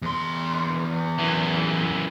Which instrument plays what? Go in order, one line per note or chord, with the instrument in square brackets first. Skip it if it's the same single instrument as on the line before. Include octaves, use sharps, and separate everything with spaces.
[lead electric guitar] E2 C6
[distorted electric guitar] F#2 E3